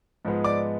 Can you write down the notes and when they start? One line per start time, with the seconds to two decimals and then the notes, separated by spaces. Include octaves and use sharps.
0.25 G#2 F3 G#3 B3
0.44 D5 D6